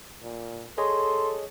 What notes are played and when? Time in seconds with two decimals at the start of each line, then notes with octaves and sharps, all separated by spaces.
0.22 A#2
0.78 G#4 A4 C#5 D#5 C6